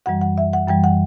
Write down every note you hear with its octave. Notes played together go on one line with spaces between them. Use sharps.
F#2 E3 G3 F#5
F#5
E5
F#5
F#2 E3 G3 G5
F#5